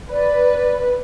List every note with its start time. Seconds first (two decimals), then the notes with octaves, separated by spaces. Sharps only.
0.11 B4 D5